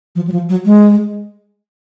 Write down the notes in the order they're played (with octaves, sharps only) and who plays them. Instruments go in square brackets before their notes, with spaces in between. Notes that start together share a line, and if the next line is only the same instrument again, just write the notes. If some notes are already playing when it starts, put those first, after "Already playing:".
[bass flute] F3
F#3
F3
F#3
G#3